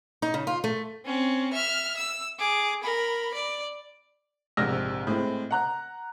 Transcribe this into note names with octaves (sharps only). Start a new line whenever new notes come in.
D#4
C#3
F4
A3
C4 C#4
E5 F6
E6
G#4 D6
A#4 B5
D5
A#1 G#2 C3 E6 F6 A#6
A2 G#3 C4
F#5 A#5 F#6